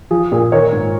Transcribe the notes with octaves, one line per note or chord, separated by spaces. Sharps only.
F3 G#4
A#2 G#4
D#3 A#4 C#5
G#2